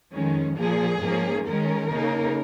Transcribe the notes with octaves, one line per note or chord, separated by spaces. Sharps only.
F2 D#3 G#3 C#4
A#2 F3 A#3 G#4
G#2 F3 A#3 C#4
D#3 G#3 C#4 A#4
C#3 A#3 D#4